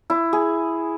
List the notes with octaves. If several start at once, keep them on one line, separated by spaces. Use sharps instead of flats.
E4
G#4